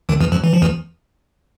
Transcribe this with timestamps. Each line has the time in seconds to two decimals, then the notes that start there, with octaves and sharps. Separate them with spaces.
0.09 D#2 D#3
0.21 E2 E3
0.32 F2 F3
0.44 E3
0.54 F3
0.62 E2 E3